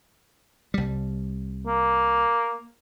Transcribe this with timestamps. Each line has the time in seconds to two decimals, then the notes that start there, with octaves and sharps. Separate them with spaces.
0.74 C2 G3
1.66 A#3